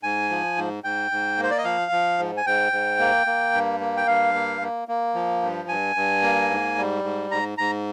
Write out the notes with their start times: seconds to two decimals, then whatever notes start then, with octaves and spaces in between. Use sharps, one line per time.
0.03 G#2 G#5
0.30 F3
0.57 G#2
0.84 G#2 G5
1.11 G#2
1.38 A#3
1.43 C5
1.50 D5
1.58 D#5
1.64 F3 F5
1.92 F3
2.19 G#2
2.37 G#5
2.46 G#2 G5
2.72 G#2
2.99 A#3
3.27 A#3
3.53 G2
3.80 A#3
3.97 G5
4.07 G2 F5
4.35 A#3
4.61 A#3
4.88 A#3
5.15 F3
5.42 G2
5.69 G2 G#5
5.96 G2
6.22 A#3
6.50 G#2
6.77 G3
7.04 G#2
7.31 G#2 A#5
7.58 G#2 A#5